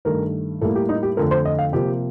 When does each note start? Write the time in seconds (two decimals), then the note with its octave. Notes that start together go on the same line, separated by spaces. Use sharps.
0.05 G2 D#3 A3 A#4
0.61 A2 G3 A#3 A4
0.75 G4
0.89 D#4
1.03 G4
1.17 F2 D3 A3 A#4
1.31 C5
1.45 D#5
1.59 F5
1.73 C3 F3 A#3 G4